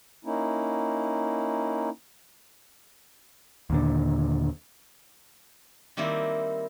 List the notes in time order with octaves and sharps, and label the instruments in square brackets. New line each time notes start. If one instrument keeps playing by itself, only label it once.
[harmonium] A#3 C#4 D#4 E4
[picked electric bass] D#2 A#2 D3
[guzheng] D#3 G3 A#3 C4 E4